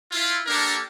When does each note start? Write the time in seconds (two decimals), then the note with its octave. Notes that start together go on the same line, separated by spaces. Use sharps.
0.11 E4 F4
0.46 A#3 D4 G4 A4 A#4